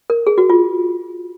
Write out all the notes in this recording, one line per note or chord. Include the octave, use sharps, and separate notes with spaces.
A#4
G#4
F#4
F4